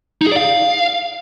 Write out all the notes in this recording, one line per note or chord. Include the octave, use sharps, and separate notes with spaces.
D#4
G#4
D5
F5